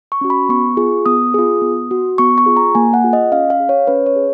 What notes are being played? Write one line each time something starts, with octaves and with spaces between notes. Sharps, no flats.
C#6
C#4 F#4
B5
B3 C#6
F4 G#4
B3 D#6
F4 G#4
B3
F#4
B3 C#6
C#6
F4 G#4
A#5
A#3 G#5
F#5
F4 G#4
D#5
C#4 F5
F5
G#4
C#5
C#4 B4
C#5
G#4